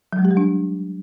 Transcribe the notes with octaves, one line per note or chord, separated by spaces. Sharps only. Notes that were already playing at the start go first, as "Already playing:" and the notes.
F#3
G#3
G4
G3
D4